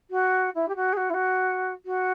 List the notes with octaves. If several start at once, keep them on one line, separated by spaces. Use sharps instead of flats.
F#4
E4
G4
F#4
G#4
F#4
E4
F#4
F#4